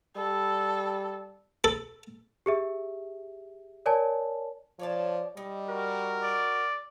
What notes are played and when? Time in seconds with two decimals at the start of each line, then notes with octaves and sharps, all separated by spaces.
0.17 G3 A4
1.64 A4
2.46 G4 G#4 E5
3.86 A#4 C#5 D5 G#5 A5
4.79 F3 C#5 D5 A5
5.37 G3 D#4
5.68 F#4 A#4
6.23 D5